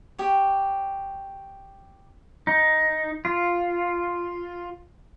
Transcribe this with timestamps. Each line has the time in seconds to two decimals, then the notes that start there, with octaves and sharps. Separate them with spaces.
0.18 G4 C#5
2.47 D#4
3.25 F4